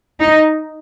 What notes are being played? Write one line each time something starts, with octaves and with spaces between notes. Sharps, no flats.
D#4